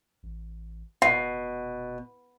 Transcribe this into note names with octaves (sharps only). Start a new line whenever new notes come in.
A1
F1 B2 F#5